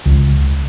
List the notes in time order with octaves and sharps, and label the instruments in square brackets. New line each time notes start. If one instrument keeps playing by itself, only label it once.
[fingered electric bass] C#2